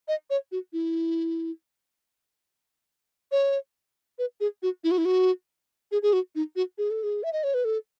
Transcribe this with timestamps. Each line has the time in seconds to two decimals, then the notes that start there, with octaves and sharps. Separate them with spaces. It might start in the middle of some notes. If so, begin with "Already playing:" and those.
0.08 D#5
0.30 C#5
0.52 F#4
0.73 E4
3.32 C#5
4.19 B4
4.40 G#4
4.63 F#4
4.84 E4
4.91 F#4
4.98 E4
5.05 F#4
5.92 G#4
6.02 G#4
6.13 F#4
6.35 D#4
6.56 F#4
6.78 G#4
6.91 A4
7.03 G#4
7.23 E5
7.33 D#5
7.44 C#5
7.54 B4
7.65 A4